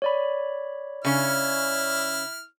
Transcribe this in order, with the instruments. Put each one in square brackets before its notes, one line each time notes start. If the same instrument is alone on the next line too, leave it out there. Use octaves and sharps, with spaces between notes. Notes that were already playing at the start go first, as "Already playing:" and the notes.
[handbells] C#5 D5 B5
[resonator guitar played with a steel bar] C#3 C#4 [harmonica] E4 F6